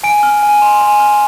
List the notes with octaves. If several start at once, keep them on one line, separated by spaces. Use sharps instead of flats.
G#5 D7
F6
G#5
C6
G#5
F6